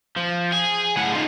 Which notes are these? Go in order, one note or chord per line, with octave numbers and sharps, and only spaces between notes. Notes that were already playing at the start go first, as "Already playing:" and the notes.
F3
G#4
A2 F#5
D#4 F4